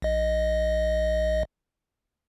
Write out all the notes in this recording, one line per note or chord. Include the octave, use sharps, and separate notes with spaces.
A#1 D#5